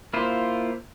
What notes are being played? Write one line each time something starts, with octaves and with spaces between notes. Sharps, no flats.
A#3 E4 F4 C5